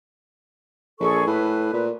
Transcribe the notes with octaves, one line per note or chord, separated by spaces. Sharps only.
A#1 G#4 A4 C#6
A2 B4
A#2